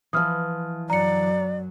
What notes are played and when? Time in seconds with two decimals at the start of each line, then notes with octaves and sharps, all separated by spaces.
0.13 E3 F3 D#6 F6
0.90 F#2 F#3 D5 A#5 C#7